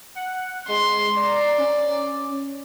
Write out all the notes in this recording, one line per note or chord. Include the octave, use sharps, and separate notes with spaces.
F#5
G#3 C6
D5 A#5
C#4